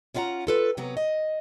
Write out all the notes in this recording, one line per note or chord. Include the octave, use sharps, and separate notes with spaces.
C#4 E4 F4 F5 F#5 A#5
F4 A4 B4
C3 F#3 B3 A#5
D#5